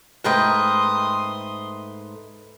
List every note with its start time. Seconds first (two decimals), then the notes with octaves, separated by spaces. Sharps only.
0.24 G#2 A3 A#4 B4 G5 C6 D#6